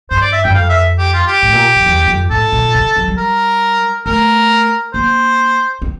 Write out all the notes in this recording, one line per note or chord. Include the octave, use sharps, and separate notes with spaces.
G2 C5
D5
E5
G2 G5
F2 F5
E5
G4
F4
G4
A2
A#2
F2
E2
F2
A2 A4
A#2
C3
F3
G3
A#4
A3 A#4
A#3 C5
C4